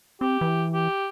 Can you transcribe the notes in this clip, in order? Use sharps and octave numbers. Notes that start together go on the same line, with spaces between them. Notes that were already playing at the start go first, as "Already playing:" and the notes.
C4 G4
E3
G4